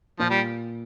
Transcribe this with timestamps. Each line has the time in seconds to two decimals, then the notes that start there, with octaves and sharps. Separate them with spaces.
0.19 A#2 F3
0.30 G3